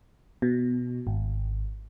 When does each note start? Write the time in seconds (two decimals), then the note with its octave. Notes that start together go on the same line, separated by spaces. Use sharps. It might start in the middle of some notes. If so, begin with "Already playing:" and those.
0.42 B2
1.07 G#1